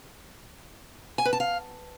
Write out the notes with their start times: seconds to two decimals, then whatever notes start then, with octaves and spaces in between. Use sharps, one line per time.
1.18 G#5
1.25 B4
1.33 A5
1.40 F5